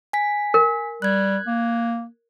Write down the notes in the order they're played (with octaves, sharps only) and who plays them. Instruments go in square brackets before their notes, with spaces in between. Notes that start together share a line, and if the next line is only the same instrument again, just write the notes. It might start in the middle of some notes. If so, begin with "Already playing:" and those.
[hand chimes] G#5 B6
[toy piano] A#4
[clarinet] G3 [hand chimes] F#6 G#6
[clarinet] A#3